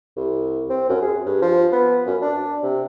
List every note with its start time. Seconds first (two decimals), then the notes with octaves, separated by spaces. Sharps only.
0.16 C2
0.70 C4
0.89 F#2
1.02 G#4
1.26 G2
1.42 F3
1.72 B3
2.06 F#2
2.22 D4
2.63 C3